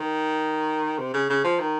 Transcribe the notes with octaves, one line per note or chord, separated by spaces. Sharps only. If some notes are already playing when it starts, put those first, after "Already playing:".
Already playing: D#3
C3
C#3
C#3
F3
D#3